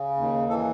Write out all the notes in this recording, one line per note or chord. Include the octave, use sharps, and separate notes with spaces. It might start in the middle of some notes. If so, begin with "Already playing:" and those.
Already playing: C#3
D#2
E3 A4